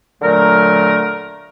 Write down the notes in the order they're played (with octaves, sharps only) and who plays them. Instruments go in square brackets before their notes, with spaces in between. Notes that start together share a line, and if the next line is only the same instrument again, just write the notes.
[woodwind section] A#2 D3 F#3 A3 A#4